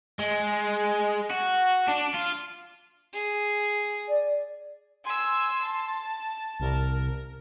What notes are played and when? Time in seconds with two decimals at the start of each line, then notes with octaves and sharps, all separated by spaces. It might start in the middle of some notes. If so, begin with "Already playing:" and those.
0.19 G#3
1.31 F#4
1.88 D4
2.14 F4
3.13 G#4
4.08 D5
5.05 G#5 C6 E6
5.63 A5
6.60 C2 A#4